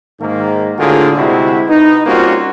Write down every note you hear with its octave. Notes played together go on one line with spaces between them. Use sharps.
G#2 D#3 A#3
A2 D3 A#3 F4 F#4 G#4
D2 C3 G#3 E4 F#4
D#4 B4
G3 A#3 C4 C#4 F4 F#4